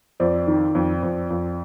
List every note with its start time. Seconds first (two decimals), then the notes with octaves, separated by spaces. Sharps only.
0.20 F2 C5 D5
0.48 D#3
0.75 F2
1.03 F2
1.30 F2